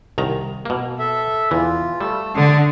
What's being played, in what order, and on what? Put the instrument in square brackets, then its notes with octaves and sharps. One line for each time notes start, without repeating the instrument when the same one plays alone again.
[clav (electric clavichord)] C2 D#3 A#5
B2 A#3
[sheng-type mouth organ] A4 E5
[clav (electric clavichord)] E2 E3 [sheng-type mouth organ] F4
[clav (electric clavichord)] G3 [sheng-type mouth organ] A3 E6
[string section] D3 [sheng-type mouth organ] D5 A5 D#6